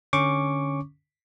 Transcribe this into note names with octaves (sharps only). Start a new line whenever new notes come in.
D3 C#4 C#6 D6